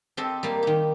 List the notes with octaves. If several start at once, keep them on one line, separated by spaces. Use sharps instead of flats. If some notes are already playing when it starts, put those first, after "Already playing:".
C4 G4 A4 D#5
G3 A#3
D#3 G4